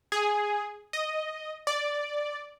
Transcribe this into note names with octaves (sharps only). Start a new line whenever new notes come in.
G#4
D#5
D5